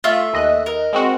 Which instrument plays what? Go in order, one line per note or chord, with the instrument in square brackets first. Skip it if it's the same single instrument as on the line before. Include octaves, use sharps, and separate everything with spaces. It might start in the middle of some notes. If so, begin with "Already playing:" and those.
[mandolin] A3 E5 [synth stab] F4
[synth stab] D#2 D#5 F#6
[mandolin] A#4
[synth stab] G#3 C4 F#4